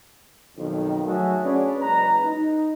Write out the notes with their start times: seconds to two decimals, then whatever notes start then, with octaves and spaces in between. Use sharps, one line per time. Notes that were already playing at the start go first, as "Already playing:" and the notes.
0.57 B1 F2 D#3
1.07 F#3 A3 F#4 G#4 C#5 E5
1.43 C#4 D4 G#4 B4 C#5 D5
1.81 F#1 G#3 B4 A#5
2.25 D#4